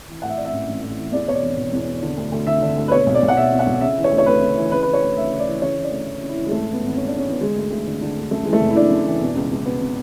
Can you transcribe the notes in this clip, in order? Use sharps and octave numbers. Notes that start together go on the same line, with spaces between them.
E3
A2 F#5
E5
E3 D5
E5
A1
A1
A2
E3
E2 D5
B2 C#5
D5
E1
E1
E2
B2
D3
D2
D2
D3 E5
D3
D2
B4
B2 C#5
B1
D5
B1
F#5
B2 E5
B2
F#5
B1
C#3 E5
E3
C#5
D2
C#5
D2 B4
C#3
E3
C#3 B4
E3 B4
C#5
D2
D2 E5
C#3
D5
E3
C#3 C#5
E3
D5
D2
D2
C#3
E4
E3
G#3
G#2 A3
E3
B3
G#1
B3
G#1 C#4
D4
G#2
C#4
E3 B3
D3 G#3
D2
D2
D3
D3
D2
F#2 A3
E3 G#3
A3
F#1
E4
F#1 D4
F#2
E3
B2
C#2
C#2
B2 B3
B2